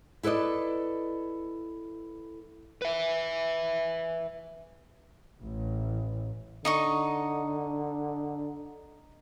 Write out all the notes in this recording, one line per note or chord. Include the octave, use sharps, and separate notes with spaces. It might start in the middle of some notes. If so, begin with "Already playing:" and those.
E4 A4 B4 D5 D#5
B4 E5
A1
D3 D#4 D#5 C#6